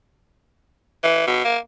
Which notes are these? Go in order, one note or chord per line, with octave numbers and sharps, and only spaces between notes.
E3
B2
A#3